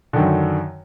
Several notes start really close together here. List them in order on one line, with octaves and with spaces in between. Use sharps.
D3 D#3 F#2